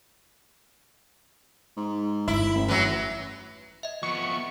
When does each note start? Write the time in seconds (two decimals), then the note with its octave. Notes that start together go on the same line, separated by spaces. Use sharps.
1.77 G#2
2.28 G1 F2 E4
2.55 A1
2.68 E3 F#3
3.83 D#5 E5
4.03 F2 B3 C#6